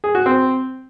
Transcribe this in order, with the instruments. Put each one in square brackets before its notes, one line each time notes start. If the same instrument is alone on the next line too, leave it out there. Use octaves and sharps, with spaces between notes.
[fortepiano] G#4
F#4
C4